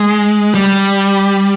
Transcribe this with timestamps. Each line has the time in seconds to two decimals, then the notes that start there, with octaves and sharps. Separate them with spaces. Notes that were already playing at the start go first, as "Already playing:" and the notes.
Already playing: G#3
0.55 G3